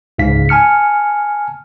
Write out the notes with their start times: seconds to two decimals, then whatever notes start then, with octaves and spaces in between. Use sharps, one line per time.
0.18 C#2 G#2 C#3 F5 B6
0.49 G#5 A5 F6 C#7